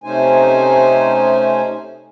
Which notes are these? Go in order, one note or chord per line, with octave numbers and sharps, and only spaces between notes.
C3 A3 C#4 D#4 C5 G#5